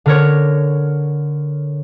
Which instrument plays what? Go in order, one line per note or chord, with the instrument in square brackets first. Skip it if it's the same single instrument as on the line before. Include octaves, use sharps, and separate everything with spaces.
[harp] D3 A#4 C#5